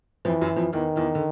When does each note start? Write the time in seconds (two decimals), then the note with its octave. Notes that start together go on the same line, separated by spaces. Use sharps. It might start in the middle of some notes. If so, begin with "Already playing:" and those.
0.25 F2 E3 F3
0.41 F#2 F#3
0.56 F2 F3
0.73 E2 D#3 E3
0.96 E2 E3
1.15 D3